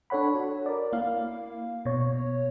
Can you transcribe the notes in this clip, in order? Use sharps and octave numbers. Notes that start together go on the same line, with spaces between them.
D4 A4 C#5 F#5 B5
F#4
A#4 D5
A#3 E4 F5
B2 C#5